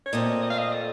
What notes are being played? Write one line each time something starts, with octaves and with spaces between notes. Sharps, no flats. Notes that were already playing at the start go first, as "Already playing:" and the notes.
C#5
A#2 A3 C4 D#5
D#5
F5
D#5
A4